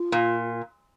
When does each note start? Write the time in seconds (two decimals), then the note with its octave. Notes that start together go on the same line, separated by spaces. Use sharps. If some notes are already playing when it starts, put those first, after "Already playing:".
Already playing: F4
0.12 A#2